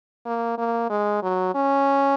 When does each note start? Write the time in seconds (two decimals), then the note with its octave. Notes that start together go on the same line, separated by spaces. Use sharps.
0.26 A#3
0.58 A#3
0.90 G#3
1.23 F#3
1.55 C#4